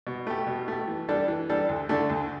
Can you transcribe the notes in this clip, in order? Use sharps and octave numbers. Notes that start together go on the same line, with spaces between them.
B2
A3 G4
B2
A3 G4
E3
G3 D4 A4
E3
G3 D4 A4
D2
D3 A3 D4 A4
D2